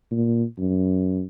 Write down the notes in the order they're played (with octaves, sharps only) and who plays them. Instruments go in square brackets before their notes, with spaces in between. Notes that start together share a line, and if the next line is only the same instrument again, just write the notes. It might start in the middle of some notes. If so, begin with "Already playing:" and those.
[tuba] A#2
F#2